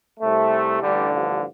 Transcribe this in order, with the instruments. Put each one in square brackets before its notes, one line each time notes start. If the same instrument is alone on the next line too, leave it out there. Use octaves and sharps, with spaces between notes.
[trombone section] C2 C3 A3
A1 G2 D3 G3
F3